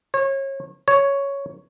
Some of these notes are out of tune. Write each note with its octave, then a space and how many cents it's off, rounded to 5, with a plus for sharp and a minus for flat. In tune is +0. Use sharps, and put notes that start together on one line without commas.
C#5 -30
C#5 +5